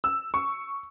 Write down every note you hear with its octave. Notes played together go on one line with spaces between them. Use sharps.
E6
C#6